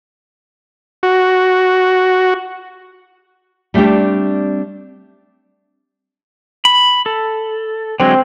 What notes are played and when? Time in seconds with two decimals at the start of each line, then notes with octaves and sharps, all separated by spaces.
1.03 F#4
3.74 G3 A3 C4 D4 G4
6.65 B5
7.06 A4
8.00 D3 F#3 G#3 C4